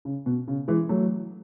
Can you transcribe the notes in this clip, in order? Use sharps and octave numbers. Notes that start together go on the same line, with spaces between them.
C#3
B2
C#3
E3 G#3
F#3 A3